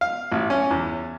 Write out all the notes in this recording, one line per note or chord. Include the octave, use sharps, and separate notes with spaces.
F5
A1
C#4
E2